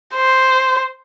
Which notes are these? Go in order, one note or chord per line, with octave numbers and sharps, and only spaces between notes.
C5